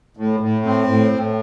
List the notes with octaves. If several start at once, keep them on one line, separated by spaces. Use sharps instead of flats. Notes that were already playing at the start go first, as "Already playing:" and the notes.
A2
A2
C4
A2
A2